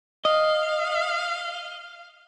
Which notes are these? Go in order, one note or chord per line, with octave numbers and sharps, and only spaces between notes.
D#5 F5